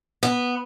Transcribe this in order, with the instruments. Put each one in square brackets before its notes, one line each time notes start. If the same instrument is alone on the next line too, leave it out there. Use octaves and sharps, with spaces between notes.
[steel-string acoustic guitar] B3